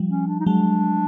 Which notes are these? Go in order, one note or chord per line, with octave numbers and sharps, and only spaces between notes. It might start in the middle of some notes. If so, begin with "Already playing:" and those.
Already playing: F3 G3
C#4
D4
D#4
F#3 G#3 D4